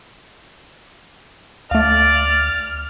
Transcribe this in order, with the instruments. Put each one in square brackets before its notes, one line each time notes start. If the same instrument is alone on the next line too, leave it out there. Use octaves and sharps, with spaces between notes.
[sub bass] D2 [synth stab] A3 F5 [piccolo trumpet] D5 [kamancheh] F6